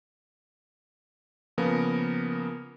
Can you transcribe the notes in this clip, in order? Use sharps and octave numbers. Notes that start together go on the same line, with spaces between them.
C#3 F3 A#3 B3 A#4